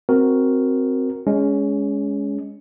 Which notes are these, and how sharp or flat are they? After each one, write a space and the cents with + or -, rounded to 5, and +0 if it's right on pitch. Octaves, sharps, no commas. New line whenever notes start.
C4 +0 F#4 +0 A#4 +0
G#3 +0 C#4 +20